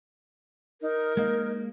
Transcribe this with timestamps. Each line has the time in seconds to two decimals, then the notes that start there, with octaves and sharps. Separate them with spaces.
0.82 D#4 A#4
1.17 G#3 A#3 D#4